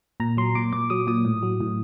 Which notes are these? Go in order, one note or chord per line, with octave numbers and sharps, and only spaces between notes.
A#2 A#5
F#3 C6
A#2 D6
A#2 D6
F#3 D#6
A#2 D#6
A2
F#3
A2